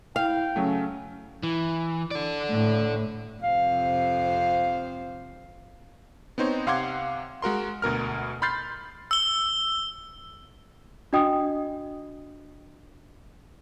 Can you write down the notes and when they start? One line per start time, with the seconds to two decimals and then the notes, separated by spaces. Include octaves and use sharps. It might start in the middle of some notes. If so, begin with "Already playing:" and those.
0.16 E4 F5 G5
0.56 C#3 F#3 A3 C#4
1.43 E3
2.11 A4 D5
2.51 A2
3.43 F2 C3 C5 F5
6.38 B3 C4 D#4 C5 C#5
6.67 C3 F5 F#5 C6 D6 G#6
7.42 G#3 F#4 A#4 C6
7.82 D2 B2 A#4 F6
8.42 B5 C6 F6 G6 A6 C7
9.11 E6 G7
11.13 D4 F#4 D#5 G5 D#6